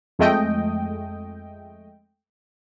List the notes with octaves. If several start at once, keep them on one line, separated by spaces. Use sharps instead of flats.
F2 G#3 A3 D#5 G5